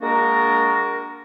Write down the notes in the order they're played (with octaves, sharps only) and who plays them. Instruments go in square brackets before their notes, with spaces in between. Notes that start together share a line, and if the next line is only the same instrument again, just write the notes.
[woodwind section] G#3 A#3 D4 F#4 A#4